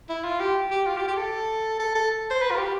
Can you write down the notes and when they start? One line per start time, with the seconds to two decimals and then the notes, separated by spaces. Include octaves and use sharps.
0.09 E4
0.25 F4
0.40 G4
0.71 G4
0.86 F4
0.97 G4
1.08 G4
1.17 A4
1.79 A4
1.95 A4
2.31 C5
2.42 B4
2.51 F4
2.58 G4